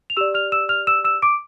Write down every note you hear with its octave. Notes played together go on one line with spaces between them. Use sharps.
F7
G4 D5 E6 E7
F6 F7
E6 E7
F6 F7
E6 E7
E6 E7
D6 D7